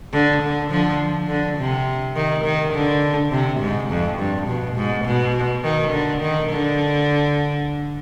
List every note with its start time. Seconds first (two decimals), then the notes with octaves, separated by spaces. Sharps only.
0.13 D3
0.42 D3
0.71 D3 F3
1.29 D3
1.58 C3
2.16 D#3
2.45 D#3
2.74 D3
3.31 C3
3.60 G#2
3.89 F2
4.18 G2
4.47 B2
4.76 G#2
5.05 B2
5.63 D#3
5.92 D3
6.22 D#3
6.50 D3